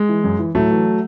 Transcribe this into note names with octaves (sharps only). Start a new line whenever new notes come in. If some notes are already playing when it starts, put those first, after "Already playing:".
Already playing: G#3
E3
F#2
E3
A2 F#3 A3
E3